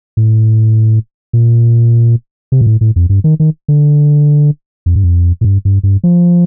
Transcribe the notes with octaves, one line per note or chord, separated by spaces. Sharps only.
A2
A#2
C3
A#2
A2
A2
F2
G2
D#3
D#3
D3
F2
G2
F2
A2
G2
G2
G2
F3